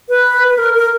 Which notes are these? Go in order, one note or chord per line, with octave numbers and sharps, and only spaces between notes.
B4
B4
A#4
A#4